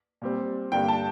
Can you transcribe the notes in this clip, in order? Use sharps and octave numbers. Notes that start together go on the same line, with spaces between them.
A#2 G3 C4
G2 D3 G3 A#3 G5
A5